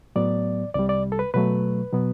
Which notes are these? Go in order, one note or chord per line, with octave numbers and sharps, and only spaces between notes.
A2 F#3 B3 D5
C2 C3 G3 D5
D5
A4
B4
B2 F#3 A3 B4
B2 F#3 B3